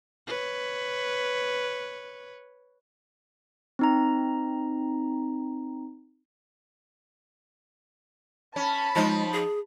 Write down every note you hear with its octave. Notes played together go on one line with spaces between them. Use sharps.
B4 C#5
C4 D#4 A#5
C#4 A5 B5
F3 G#3 D#4
G#4